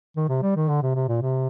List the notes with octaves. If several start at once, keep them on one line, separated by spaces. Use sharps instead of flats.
D#3
C3
G3
D#3
D3
C3
C3
A#2
C3